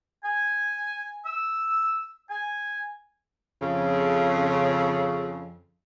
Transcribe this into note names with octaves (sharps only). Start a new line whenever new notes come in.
G#5
E6
G#5
F2 C#3